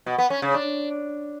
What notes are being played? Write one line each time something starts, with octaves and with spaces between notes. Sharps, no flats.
B2
B3
C#4
C#3
D4